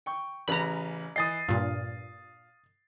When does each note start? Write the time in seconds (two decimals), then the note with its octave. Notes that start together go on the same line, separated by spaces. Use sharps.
0.06 G5 C#6
0.48 A1 C#3 B4 A#5 B5
1.16 E3 D#5 D#6 A6 C7
1.48 G2 A#2 F5